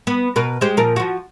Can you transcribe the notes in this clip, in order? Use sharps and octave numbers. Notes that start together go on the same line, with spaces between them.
B3
B2 A#4 B4
G#3 G4 C5
A#2 F3 A#4
F3 F#4